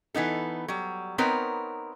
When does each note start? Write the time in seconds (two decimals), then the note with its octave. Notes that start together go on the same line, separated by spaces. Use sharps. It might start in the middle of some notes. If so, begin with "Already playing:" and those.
0.14 E3 B3 D#4 A4
0.68 F#3 G3
1.18 B3 C4 D#4 A#4 B4 C#5